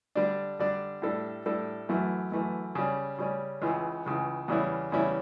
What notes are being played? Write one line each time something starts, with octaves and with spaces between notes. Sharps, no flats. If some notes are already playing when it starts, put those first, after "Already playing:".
D3 G3 D4
D3 G3 D4
A2 G3 D4 A4
A2 G3 D4 A4
F#2 E3 A3
F#2 E3 A3
C#3 G3 C#4
C#3 G3 C#4
C#2 C#3 E3
C#2 C#3 E3
E2 C#3 G3 C#4 E4
E2 C#3 G3 C#4 E4